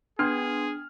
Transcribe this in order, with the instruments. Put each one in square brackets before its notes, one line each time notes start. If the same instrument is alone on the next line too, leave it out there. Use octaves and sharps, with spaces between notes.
[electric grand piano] B3 C6 G#6 [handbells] D4 [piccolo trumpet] G#4 [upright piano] F6